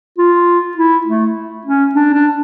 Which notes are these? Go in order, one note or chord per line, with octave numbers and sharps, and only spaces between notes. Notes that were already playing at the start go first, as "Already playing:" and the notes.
F4
E4
A3
C#4
D4
D4